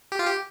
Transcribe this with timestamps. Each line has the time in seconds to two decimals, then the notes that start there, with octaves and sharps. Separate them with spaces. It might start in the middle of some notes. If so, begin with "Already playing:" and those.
0.12 G4
0.19 F4
0.25 G4